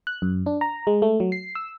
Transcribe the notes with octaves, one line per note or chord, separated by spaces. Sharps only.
F#6
F#2
D4
A#5
G#3
A3
F#3
C7
E6